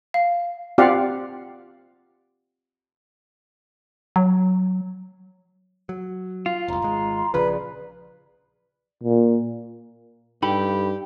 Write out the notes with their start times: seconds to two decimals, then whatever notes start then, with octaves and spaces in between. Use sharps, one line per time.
0.14 F5
0.78 C4 F4 G4 D5 F5 F#5
4.16 F#3
5.89 F#3
6.46 F4 F5
6.68 F1 C2 A#5 C6
6.82 G#1 G#3
7.34 A#1 C#3 F3 G#4 B4 D5
9.03 A#2
10.43 G2 D#4 G4 A4 G5 B5